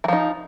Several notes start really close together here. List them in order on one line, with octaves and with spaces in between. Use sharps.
E3 F3 D#4